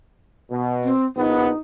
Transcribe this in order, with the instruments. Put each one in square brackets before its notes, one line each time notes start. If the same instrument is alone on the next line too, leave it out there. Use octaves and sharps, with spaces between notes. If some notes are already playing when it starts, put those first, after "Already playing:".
[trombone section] B2
[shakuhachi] C4
[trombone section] A#1 B3 [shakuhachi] D#4